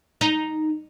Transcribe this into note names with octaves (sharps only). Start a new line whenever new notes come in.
D#4